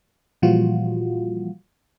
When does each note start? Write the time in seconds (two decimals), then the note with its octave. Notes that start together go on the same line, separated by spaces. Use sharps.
0.42 A#2 E3 F3 G3 F4 F#4